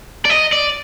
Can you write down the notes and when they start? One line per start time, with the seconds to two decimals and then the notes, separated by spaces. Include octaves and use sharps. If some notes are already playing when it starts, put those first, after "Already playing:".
0.25 D5
0.30 D#5
0.52 D5